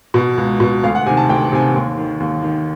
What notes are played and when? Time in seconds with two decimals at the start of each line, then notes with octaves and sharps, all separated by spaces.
0.14 B2
0.38 C#2
0.60 B2
0.83 D2 F5
0.95 F#5
1.06 C3 G#5
1.09 D#3
1.17 A5
1.29 D2 G5
1.52 C3 D#3 G#5
1.60 A5
1.74 D#2
1.97 D#3
2.20 D#2
2.43 D#3